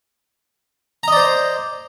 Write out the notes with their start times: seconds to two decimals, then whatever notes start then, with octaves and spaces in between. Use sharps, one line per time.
1.03 A#5
1.08 D#5
1.12 D5
1.17 C5